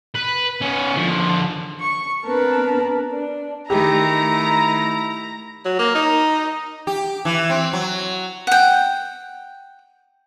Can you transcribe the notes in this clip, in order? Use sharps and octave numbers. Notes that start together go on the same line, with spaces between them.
B4
B3 C#4
D3 F3
C#6
B3 C4 D4 A#4 B4 A5
D4
D#3 A3 E4 G4 A#5
F#3
A#3
D#4
G4
E3
C4
F#3
F#5 G5